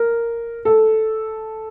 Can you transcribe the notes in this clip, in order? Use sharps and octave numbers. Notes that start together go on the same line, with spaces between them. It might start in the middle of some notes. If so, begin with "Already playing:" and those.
Already playing: A#4
A4